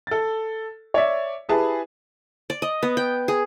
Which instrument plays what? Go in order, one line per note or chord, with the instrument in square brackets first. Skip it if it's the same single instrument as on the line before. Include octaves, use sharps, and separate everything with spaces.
[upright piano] A4 A6
C#5 D5 E5
E4 G4 G#4 B4 A5
[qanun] D5
D#5
B3
G5
G#4